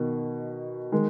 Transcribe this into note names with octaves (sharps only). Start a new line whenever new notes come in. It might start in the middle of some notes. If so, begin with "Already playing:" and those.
Already playing: B2 D#3
D#3 G#3